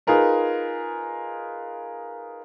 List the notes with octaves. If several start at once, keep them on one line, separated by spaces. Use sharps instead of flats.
D#4 F4 G#4 A#4 B4